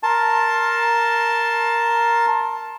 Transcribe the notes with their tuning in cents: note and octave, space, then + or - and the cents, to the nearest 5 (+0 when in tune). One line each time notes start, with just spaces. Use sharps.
A#4 +0 A5 +0 C6 +20